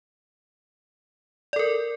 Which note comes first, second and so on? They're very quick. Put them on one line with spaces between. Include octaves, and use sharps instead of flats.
D5 A4 A#4